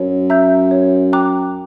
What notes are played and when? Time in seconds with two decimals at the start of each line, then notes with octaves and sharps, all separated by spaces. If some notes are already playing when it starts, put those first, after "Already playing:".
Already playing: F#2 C#5
0.30 E5 A#5 E6 G6
0.71 C#5
1.13 G5 A#5 D6 F#6